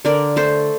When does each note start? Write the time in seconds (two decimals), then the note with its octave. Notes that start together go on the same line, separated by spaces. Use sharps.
0.05 D3 A#4 D5
0.36 A3 A4 C5